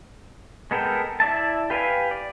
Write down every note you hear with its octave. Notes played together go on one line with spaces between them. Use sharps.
G#3 B3 A4 A#4 G5
E4 D5 E5 A5
G4 B4 F5 G5 G#5
D5